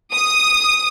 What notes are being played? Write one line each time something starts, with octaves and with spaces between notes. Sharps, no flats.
D#6